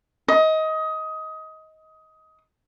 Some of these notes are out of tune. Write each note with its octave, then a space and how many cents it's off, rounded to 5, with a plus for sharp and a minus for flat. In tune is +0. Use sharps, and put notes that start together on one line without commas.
D#5 +20